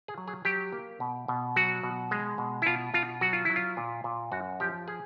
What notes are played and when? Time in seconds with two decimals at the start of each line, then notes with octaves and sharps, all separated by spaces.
0.08 G#4
0.18 F#3
0.28 G#4
0.45 F#3 G4
0.72 A#3
1.00 B2
1.28 B2
1.56 F#3 F#4
1.83 B2
2.11 G#3
2.38 B2
2.62 E4
2.66 B2 F4
2.94 B2 F4
3.21 F#3 F#4
3.33 F4
3.45 F#3 E4
3.56 F4
3.77 A#2
4.04 A#2
4.32 F#2 F#4
4.60 F3 G4
4.88 G#4